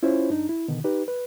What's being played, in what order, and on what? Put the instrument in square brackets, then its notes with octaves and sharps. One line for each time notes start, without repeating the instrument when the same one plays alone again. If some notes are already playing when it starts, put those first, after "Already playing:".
[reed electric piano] C#4 E4 F4 C5 C#5
G2 D4 D#4
E4
B2 D3 D#3
D#4 G4 B4
B4